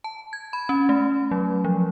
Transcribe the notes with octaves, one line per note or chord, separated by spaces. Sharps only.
A5
G#6
B5
C#4
A3
F#3
F3